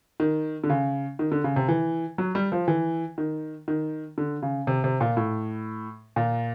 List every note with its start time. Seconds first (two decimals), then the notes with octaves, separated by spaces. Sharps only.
0.20 D#3
0.64 D3
0.70 C#3
1.19 D#3
1.32 D3
1.44 C#3
1.56 C3
1.68 E3
2.18 F#3
2.35 G3
2.52 F3
2.68 E3
3.18 D#3
3.68 D#3
4.18 D3
4.42 C#3
4.67 C3
4.84 C3
5.01 A#2
5.17 A2
6.16 A#2